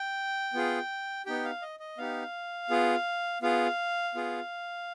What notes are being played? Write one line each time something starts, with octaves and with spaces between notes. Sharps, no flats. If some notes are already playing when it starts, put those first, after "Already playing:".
Already playing: G5
B3 F4 G#4
B3 D#4 G4 G5
F5
D#5
D#5
B3 D#4 G4 F5
B3 F4 G#4
B3 F4 G#4 F5
B3 F4 G#4